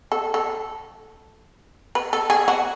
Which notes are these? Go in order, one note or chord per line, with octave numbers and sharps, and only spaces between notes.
A4
A4
B4
A4
G#4
F#4